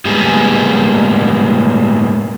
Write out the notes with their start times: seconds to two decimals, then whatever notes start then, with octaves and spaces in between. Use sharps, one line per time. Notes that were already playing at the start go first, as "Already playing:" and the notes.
0.05 A2 G3 G#3 A#3 B3 G#4